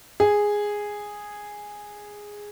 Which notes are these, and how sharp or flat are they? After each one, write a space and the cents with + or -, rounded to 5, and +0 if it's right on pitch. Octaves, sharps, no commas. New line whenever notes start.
G#4 -5